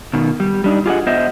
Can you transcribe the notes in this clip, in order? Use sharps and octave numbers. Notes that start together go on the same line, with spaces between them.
B2 D#3
G3
G3 D4 D#4
F4 G4 G#4 A#4 D#5 F#5
B3 C5 D#5 E5